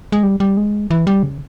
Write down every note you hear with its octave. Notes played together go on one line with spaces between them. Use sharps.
G#3
G3
G3
G#3
E3
G3
C#3